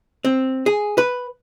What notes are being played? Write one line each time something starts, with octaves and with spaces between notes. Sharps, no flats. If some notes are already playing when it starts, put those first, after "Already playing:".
C4
G#4
B4